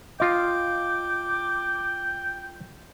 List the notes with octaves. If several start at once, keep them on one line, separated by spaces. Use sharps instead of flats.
F4 D#5 G5 D6